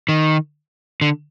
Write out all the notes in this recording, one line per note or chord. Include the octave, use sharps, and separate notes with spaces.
D#3
D3